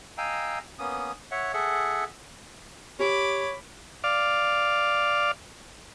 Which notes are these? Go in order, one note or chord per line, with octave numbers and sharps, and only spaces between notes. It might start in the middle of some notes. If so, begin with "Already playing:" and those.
D#5 F5 G5 G#5 A#5 E6
A#3 B3 C#4 D#6
C#5 E5 F#5
G#4 A4 E5 F#5
G4 C#5 B5 D6
D5 F5